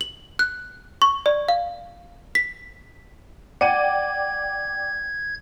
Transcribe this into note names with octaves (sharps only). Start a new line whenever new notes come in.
F#7
F#6
C#6
D5
F5
B6
D5 F#5 G5 G#6 D#7